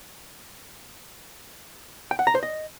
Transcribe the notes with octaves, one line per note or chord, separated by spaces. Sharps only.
G5
F#5
A#5
C5
D#5